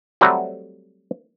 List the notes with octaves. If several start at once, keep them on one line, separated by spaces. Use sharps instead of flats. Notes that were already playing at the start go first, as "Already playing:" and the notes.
F#3 G3 A3 C4 F#4